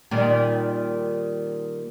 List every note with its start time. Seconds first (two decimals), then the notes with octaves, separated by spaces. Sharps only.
0.11 A#2 D#3 G3